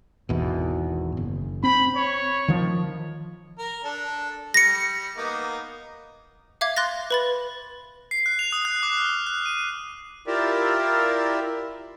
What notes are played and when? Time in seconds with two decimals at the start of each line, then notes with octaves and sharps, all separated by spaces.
0.29 G#1 E2 B2
1.17 F#1
1.63 C4 B5
1.96 C#5
2.48 D#3 F3
3.59 A#4
3.84 D4 A4
4.54 G3 A#6 C#7
5.17 A#3 B3 D#4
6.61 E5 F5 D6 G#6
6.76 C6 F#6 A6 A#6
7.11 B4 B5 A6
8.11 C7
8.26 F#6
8.39 F7
8.52 D#6
8.65 F#6
8.83 D6
8.97 F6
9.26 F#6
9.46 D#7
10.27 E4 F4 G4 A#4 D5 E5